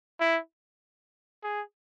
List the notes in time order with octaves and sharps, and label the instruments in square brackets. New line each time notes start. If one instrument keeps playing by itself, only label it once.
[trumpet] E4
G#4